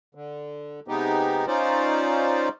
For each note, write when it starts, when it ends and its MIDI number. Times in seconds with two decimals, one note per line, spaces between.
0.15 0.80 50
0.88 1.46 48
0.88 1.46 56
0.88 1.46 59
0.88 1.46 63
0.88 1.46 67
1.47 2.49 61
1.47 2.49 63
1.47 2.49 65
1.47 2.49 72
1.47 2.49 74